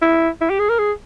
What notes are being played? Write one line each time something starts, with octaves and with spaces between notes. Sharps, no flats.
E4
E4
G4
G#4
A#4
G#4